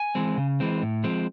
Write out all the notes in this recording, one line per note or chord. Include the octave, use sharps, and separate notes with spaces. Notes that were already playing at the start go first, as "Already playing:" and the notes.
Already playing: G#5
E3 G#3 C4
C#3
E3 G#3 C4
A2
F3 G#3 C4